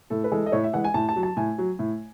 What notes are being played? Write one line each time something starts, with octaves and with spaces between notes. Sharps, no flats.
A2 A4
B4
E3 G#3 A4
D#5
A2 C#5
E5
E3 G#3 F#5
G#5
A2 A5
A5
F#3
A5
A2 G#5
F#3
A2